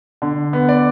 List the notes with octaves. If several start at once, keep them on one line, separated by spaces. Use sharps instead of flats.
D3
B3
D5